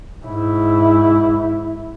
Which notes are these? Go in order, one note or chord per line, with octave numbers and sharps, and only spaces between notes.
G#2 E4